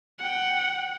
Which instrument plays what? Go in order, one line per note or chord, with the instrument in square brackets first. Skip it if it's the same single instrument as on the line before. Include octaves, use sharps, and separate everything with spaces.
[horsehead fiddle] F#5 G5